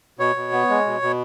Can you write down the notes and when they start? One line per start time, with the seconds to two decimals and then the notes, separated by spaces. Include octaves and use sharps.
0.19 B2 C#5
0.36 B2
0.52 B3
0.69 G#3
0.86 B2
1.02 B2